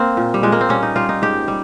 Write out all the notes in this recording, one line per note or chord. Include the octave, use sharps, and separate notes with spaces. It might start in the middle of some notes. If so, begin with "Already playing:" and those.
Already playing: A#3 C4
A#2
G3
A#2 G#3
A#3
C4
G3 C#4
D#4
G3 F4
D#4
G#2 G4
G3